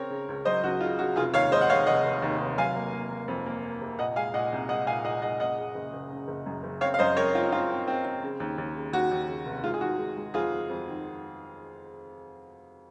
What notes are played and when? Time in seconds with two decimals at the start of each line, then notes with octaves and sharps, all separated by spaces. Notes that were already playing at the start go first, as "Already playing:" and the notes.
Already playing: C#3 C4 A#4 C#5
0.10 C#3
0.28 C#2
0.45 F#3 C5 D#5
0.63 C#2 F#4
0.81 C#3 F4
0.99 C#3 F#4
1.16 F1 F4 G#4
1.34 D#2 C#5 F5
1.51 G#3 C5 D#5
1.61 F#5
1.70 F1 C#5 F5
1.86 F1 D#5 F#5
2.04 F1
2.22 D#2
2.40 F1
2.58 F#3 F5 G#5
2.76 A#3
2.93 A#3
3.10 A#3
3.28 F2
3.46 A#3
3.63 A#3
3.82 C3
3.99 A#2 D#5 F#5
4.16 G#3 F5 G#5
4.34 A#2 D#5 F#5
4.52 C2
4.69 G#3 D#5 F#5
4.87 A#2 F5 G#5
5.05 A#2 D#5 F#5
5.22 G#3 D#5 F#5
5.40 F#1 D#5 F#5
5.58 C#3
5.75 F#1
5.93 F#1
6.11 C#3
6.28 F#1
6.46 F#2
6.63 F#1
6.81 C4 C#5 F5
6.94 F5
6.99 F#2 C5 D#5
7.17 C4 A#4 C#5
7.35 C4 F4
7.52 C4 F4
7.70 C4
7.88 C4
8.05 C4
8.23 C#3
8.40 D#2
8.58 D#2
8.76 C#3
8.93 D#2 F#4
9.11 D#2
9.28 C#3
9.46 F1
9.64 G#3 F4
9.74 G#4
9.81 D#3 F#4
9.99 G#3
10.17 G#3
10.34 F2 F4 G#4
10.53 G#3
10.70 F2
10.88 D#3